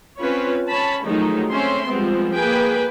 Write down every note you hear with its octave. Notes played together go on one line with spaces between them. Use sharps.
C4 C#4 F4 B4 C#5
C#4 C#5 A5 B5
D#3 F3 F#3 G#3 A3 D#4
A3 C4 C#4 E5 C6
F3 G3 G#3 B3 C4
A#3 G#4 B4 G5 G#5